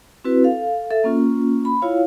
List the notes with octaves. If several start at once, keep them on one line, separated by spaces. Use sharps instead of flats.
C4 E4 F#4 B4
A4 F5
A4 E5
A#3 C#4 F4
B5
E4 F4 C#5 F5